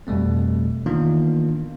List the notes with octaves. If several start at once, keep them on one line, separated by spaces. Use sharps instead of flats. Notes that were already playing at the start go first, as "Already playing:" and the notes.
F2 B2 G3 A3 C4
D#3 E3 A#3 B3 D4 F4